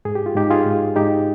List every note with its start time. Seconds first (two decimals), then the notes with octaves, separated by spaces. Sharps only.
0.05 G#2 G#4
0.15 G4
0.26 F4
0.35 G#2 D#4 G4
0.50 F4 G#4
0.66 G#2
0.96 G#2 D#4 G4